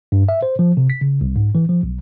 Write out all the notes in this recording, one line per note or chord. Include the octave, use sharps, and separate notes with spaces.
G2
E5
C5
F3
C3
B6
C#3
C2
G#2
E3
F3
B1